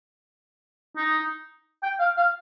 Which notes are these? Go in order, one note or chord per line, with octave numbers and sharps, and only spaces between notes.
D#4
G5
F5
F5